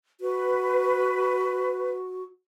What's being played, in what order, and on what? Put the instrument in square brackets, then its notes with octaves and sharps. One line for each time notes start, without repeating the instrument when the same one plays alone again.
[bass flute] F#4 [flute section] B4